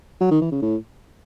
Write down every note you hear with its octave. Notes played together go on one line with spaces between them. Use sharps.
F#3
D#3
E3
C#3
A2